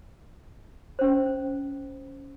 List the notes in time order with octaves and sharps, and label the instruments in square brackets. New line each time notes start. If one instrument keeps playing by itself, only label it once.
[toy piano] C#4 C5